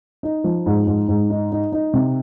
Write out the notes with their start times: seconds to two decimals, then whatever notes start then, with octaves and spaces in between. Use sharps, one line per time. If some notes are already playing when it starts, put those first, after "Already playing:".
0.23 D#4
0.44 F3
0.66 G#2
0.87 G#2
1.08 G#2
1.30 D#4
1.52 D#4
1.72 D#4
1.94 C3